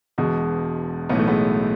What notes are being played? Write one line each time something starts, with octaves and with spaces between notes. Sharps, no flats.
E1 E2 B2 G#3
B1 A2 E3 B3
A3
G#3 B3